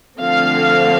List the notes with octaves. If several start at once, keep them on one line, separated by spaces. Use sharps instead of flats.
D3 F3 A3 C4 F5